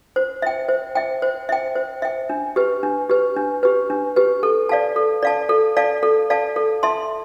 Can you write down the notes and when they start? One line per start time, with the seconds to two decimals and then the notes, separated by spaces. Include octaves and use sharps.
0.16 C5
0.42 E5 G5
0.68 C5
0.95 E5 G5
1.22 C5
1.49 E5 G5
1.76 C5
2.02 E5 G5
2.30 D4
2.56 G4 B4
2.83 D4
3.10 G4 B4
3.37 D4
3.63 G4 B4
3.90 D4
4.16 G4 B4
4.43 A4
4.69 D5 F5 A5
4.96 A4
5.22 D5 F5 A5
5.49 A4
5.77 D5 F5 A5
6.03 A4
6.30 D5 F5 A5
6.56 A4
6.83 E5 A5 C6